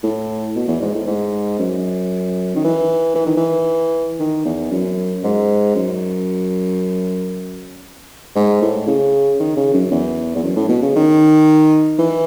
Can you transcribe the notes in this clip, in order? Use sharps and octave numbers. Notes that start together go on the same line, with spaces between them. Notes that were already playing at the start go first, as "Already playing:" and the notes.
A2
B2
E2
G#2
A2
G#2
F#2
D#3
E3
E3
D#3
E3
D#3
E2
F#2
G#2
F#2
G#2
A2
C#3
D#3
C#3
F#2
E2
E2
F#2
A2
B2
C#3
D#3
E3